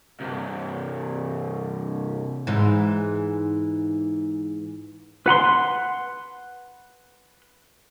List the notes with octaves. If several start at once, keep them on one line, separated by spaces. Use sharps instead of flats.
C2 G2
G#2 E3
B4 F#5 B5 C6